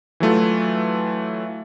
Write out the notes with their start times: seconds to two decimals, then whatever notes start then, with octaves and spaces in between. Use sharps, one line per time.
0.20 E3 F#3 A3 F4